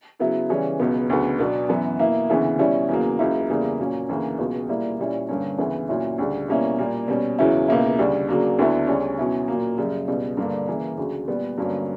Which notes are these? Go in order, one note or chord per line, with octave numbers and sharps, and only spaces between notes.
C#3 F#3 B3 E4
C#3 E3 G3 C#4
C#2 B2 F#3 B3
D2 C#3 F#3 B3
B2 F#3 B3 D4
F#2 E3 B3
B2 A#3 E4
D2 C#3 E3 B3 E4
B2 G3 C#4 E4
E2 C#3 F#3 A#3
C#2 C#3 F#3 A#3 E4
E2 C#3 G3 A#3 E4
A#2 F#3 A#3 C#4
D2 C#3 E3 A#3
C#2 B2 F#3
A#2 G3 A#3 E4
A#2 G3 C#4 E4
G2 D3 A#3 C#4
D2 C#3 E3 B3 E4
A#2 F#3 C#4 E4
D2 C#3 G3
B2 G3 A#3 C#4 E4
A#2 G3 A#3
B2 G3 C#4
E2 C#3 F#3 C#4 E4
C#2 B2 A#3 E4
D2 C#3 G3
C#3 F#3 A#3 D4
D2 D3 F#3 B3 E4
D2 C#3 G3 C#4
B2 F#3 C#4 E4
A#2 F#3 A#3
F#2 C#3 G3
C#2 B2 G3
G2 D3 A#3 D4
C#3 E3 A#3
D2 C#3 F#3
A#2 G3 B3
G2 D3 F#3 A#3 C#4